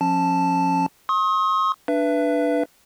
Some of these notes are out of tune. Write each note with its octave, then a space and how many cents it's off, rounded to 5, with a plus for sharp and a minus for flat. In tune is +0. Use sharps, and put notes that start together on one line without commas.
F3 +25 C#4 -25 A5 +0
C6 +45 D#6 +30
D4 +5 B4 +0 E5 +25